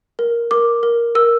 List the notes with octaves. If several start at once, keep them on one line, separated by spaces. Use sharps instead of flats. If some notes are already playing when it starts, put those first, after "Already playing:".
A#4
A#4 D6
A#4
A#4 E6